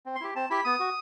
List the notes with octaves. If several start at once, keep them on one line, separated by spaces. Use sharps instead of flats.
C4
C6
E4 G4
C4 A5
E4 G4 B5
B3 D#6
F#4